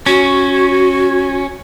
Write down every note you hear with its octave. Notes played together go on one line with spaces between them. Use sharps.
C#4 F#4